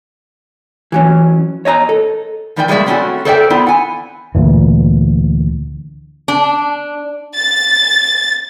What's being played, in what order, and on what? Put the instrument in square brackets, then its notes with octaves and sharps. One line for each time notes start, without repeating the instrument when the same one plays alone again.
[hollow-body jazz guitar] E3 F#3 C#4
C#5 D#5 G#5 A#5
A4
[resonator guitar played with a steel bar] A2 F3 E4 D5 E5 G5
G3 G#3 A#3 F#4 D5 E5
A3 C4 C#4 D#4 E4 F#4
A4 A#4 C5 D5 E5 G5
B3 C4 E4 F4
F#5 G#5
[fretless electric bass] D2 A#2 E3
[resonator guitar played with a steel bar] D4
[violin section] A6